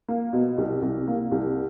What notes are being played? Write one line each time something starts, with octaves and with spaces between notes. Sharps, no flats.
A#3
B2
C2
C2
A#3
C2